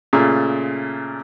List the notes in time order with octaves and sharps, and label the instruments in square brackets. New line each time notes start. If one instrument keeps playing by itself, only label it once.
[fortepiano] A#2 C#3 A3